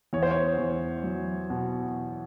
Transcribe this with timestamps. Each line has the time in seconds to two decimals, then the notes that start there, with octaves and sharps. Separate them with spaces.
0.13 E2 C#5
0.23 C5
0.31 C#5
0.59 E2
1.04 F#3
1.50 B2